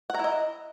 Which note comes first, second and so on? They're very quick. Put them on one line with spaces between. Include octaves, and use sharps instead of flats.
F#5 A#5 E4 D#5